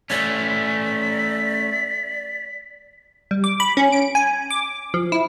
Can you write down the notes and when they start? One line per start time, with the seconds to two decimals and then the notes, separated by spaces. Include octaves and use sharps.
0.10 A3 C#4 D5 B6
3.31 G3
3.44 D6
3.60 B5
3.77 C#4
3.92 D7
4.15 G#5
4.51 D6
4.94 F3
5.12 E4